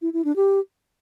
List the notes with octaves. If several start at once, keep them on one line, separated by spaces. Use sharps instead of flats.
E4
E4
D4
G4